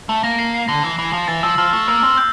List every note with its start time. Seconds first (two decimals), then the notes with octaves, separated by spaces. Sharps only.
0.09 A3
0.23 A#3 A#6
0.39 C7
0.54 C7
0.68 D3 A#6
0.83 E3
0.99 E3
1.13 F3
1.28 E3 A6
1.43 F3 E6
1.58 F3 F6
1.73 A3
1.88 A#3 E6
2.03 C4 E6
2.17 G6